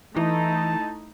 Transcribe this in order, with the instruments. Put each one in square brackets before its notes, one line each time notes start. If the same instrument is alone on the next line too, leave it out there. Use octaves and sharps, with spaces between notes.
[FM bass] E3 [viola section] A3 D#4 E4 [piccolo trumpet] A5